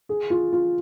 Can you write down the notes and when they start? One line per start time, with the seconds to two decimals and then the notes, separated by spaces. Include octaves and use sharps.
0.09 G#4
0.30 F4
0.53 F4